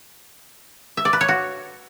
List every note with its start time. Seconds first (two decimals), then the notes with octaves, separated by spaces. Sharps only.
0.97 E5
1.05 D5
1.13 B4
1.21 C#5
1.28 F#4